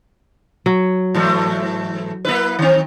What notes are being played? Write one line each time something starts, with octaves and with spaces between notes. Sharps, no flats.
F#3
G#2 E3 A3
A#3 E4 B4
D#3 C4